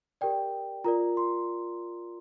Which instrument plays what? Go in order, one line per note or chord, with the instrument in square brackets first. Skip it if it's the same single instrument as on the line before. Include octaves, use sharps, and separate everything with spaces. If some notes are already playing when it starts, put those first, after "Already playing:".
[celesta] G4 A#4 D5 G5
F4 A#4 D5 A#5
C6